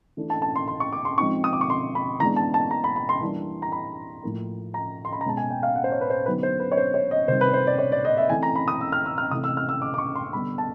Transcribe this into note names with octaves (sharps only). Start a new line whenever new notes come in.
E3 A3 D4
A5
A5
C6
C6
C#6
D6
C6
F3 G#3 C4 D#4 C#6
D#6
D6
C#6
C6
B5
E3 G#3 B3 D4 A#5
A5
A5
A#5
B5
B5
C6
E3 G3 A#3 D4
A#5
B5
A2 F3 A#3
A#5
C6
B5
A#5
B2 G#3 C#4 A5
G#5
G5
F5
F#5
C5
C#5
B4
C5
D3 F#3 B3 D#4 B4
C5
B4
C#5
C5
C#5
D#5
C3 D#3 G3 C5
B4
C5
D5
C#5
D5
D#5
E5
E3 A3 C4 G#5
A#5
B5
D#6
E6
F6
E6
F6
C3 E3 A3 D#6
E6
F6
E6
D6
D6
C#6
C6
D3 G3 B3 B5
A5